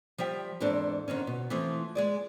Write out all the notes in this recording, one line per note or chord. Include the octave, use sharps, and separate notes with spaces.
F3 G3 E5 G5
E2 G#2 C4 D4 A4
D3 D#3 C4 C#4
B2
E3 F3 A3 C4
G#3 G#4 D5